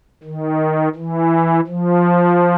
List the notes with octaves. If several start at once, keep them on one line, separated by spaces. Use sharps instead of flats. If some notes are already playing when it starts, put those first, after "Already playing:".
D#3
E3
F3